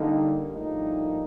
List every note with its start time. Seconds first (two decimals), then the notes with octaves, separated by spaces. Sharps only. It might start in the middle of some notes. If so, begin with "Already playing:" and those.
Already playing: D3 G3 A#3 D#4
0.52 A#1 A2 G3 A#3 D#4